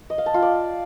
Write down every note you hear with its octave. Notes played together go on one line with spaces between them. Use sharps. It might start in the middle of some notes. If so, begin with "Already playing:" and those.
D#5
F5
A5
F4
D5